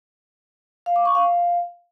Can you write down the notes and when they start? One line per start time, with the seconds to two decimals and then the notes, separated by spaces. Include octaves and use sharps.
0.86 F5
0.96 D6
1.05 C#6
1.15 F5